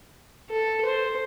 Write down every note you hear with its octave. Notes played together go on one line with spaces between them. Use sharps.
A4
C5